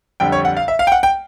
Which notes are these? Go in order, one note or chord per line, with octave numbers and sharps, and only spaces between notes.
F2 D3 G3 G5
C#5
F#5
F5
E5
F5
G5
F#5
G5